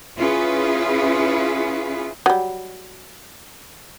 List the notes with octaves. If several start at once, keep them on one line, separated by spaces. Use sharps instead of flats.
C#4 E4 F4 G#4 B4
F#3 G3